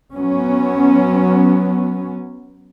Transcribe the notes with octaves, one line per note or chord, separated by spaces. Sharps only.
F#3 B3 C#4